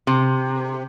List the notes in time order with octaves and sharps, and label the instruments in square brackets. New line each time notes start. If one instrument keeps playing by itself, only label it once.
[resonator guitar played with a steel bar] C3